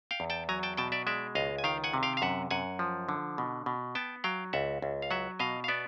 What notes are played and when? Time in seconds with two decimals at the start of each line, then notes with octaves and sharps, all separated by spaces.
0.11 F5 G5
0.20 E2
0.30 G5 A5
0.49 F#3 G#5 A#5
0.63 G5 A5
0.77 B2 G5 A5
0.92 D5 E5
1.07 G#3 D5 E5
1.35 C#2 D#5 F5
1.58 G#5
1.64 D#3 F5 G5
1.84 F#5 G#5
1.94 C3
2.03 F5 G5
2.17 F5
2.22 F#2 E5 F#5
2.51 F#2 F#5 G#5
2.79 F3
3.09 D3
3.38 B2
3.66 B2
3.95 B3 G5 A5
4.24 F#3 F5 G5
4.53 C#2 E5 F#5
4.82 C#2
5.02 F5
5.10 F#3 E5 F#5
5.39 B2 D#5 F5
5.64 F5
5.68 B3 D5 E5